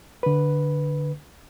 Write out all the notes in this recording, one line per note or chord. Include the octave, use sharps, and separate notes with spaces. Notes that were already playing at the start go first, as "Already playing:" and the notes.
D3 B4